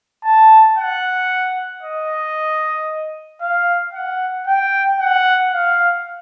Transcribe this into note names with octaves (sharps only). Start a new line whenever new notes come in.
A5
F#5
D#5
F5
F#5
G5
F#5
F5